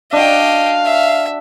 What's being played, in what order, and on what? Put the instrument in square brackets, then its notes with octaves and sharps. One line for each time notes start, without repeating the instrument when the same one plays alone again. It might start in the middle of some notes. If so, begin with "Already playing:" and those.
[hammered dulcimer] D4 F#4 [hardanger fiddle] D#5 G5 [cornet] F5
[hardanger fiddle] E5